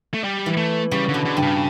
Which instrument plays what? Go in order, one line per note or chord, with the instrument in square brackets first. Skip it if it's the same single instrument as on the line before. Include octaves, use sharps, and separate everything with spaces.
[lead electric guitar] A3
G3
[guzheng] E3
[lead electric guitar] A3
[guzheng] C#3 [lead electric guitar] G3
[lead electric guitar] D3
[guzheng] B2
[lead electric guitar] D3
[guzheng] G2
[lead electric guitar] C#3